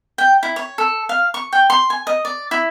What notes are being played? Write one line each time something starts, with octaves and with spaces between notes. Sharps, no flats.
G5
E4
C#5
A4
F5
C#6
G5
C6
G#5
D#5
D5
E4